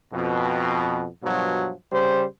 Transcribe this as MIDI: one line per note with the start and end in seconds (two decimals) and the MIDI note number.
0.13 1.06 41
0.13 1.06 47
1.23 1.71 43
1.23 1.71 47
1.23 1.71 53
1.23 1.71 54
1.92 2.24 49
1.92 2.24 55
1.92 2.24 72